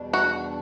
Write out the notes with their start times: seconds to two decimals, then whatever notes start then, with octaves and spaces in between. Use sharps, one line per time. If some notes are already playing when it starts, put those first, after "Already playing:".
Already playing: E2 B2 G3 D4
0.13 F#4